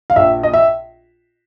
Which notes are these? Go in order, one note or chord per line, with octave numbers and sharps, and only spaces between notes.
F5
A#1 E5
D#5
E5